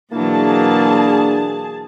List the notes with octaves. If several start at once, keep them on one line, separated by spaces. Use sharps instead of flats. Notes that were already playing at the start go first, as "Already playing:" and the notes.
B2 E3 F#3 A#3 D4 E4 G#4 A5